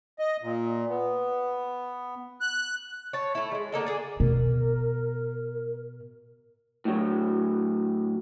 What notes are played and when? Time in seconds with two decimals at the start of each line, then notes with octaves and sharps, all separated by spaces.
0.19 D#5
0.42 A#2
0.89 B3
2.41 F#6
3.13 C#5 A5
3.35 A3 E4
3.52 G3 G#3
3.72 D3 A#3 A4 D#5
3.86 G#4 D5
4.20 B2 A#4
6.85 A2 F#3